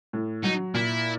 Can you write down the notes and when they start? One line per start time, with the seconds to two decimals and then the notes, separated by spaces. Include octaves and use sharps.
0.13 A2
0.43 F#3 D#4
0.74 A#2 E4